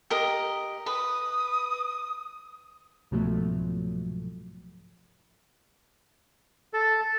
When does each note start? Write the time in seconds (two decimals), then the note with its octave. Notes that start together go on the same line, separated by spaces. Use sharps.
0.10 G4 A#4 D#5
0.86 B4 B5 D#6
3.11 C2 G#2 B2 F3 F#3 A3
6.74 A4